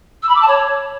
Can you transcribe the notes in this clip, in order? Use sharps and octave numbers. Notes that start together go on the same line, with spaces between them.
E6
B5
D6
A5
C#5